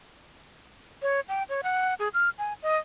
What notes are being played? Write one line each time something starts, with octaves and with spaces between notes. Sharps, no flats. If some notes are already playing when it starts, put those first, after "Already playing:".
C#5
G5
C#5
F#5
G#4
F6
G#5
D#5